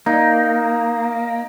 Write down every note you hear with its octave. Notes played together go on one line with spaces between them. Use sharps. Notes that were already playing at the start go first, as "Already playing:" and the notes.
A#3 D#4